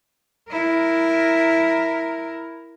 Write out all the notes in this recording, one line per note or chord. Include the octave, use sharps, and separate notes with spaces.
E4 A#4